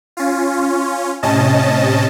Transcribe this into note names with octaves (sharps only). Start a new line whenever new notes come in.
C#4 F4
A2 C3 C#4 D#5 A5